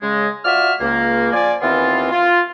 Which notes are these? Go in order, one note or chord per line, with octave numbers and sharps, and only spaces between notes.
C#3 G#3
F4 F#4 D5 E5 F6
C#2 A#3
F3 D5 G#5
D#2 E3 B3 C4 F4
F4